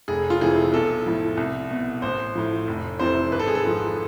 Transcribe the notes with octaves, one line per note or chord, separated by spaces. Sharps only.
F1 G#4
F4
F2 C3 E3 G#4
B1 A4
A2 F3
C2
B2
A1 C5
A2 F3
F1
F2 C3 E3 C5
G#1 B4
A4
G#4
A4
G#2 F3